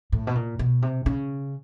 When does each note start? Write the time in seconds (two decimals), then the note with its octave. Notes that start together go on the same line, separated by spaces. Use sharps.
0.12 A2
0.27 B2
0.35 A#2
0.59 B2
0.82 C3
1.06 C#3